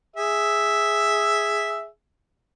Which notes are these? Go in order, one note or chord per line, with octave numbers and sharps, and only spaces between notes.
G#4 E5